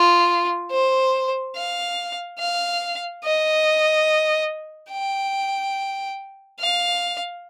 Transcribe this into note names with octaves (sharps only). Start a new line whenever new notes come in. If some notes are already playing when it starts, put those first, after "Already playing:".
Already playing: F4
C5
F5
F5
D#5
G5
F5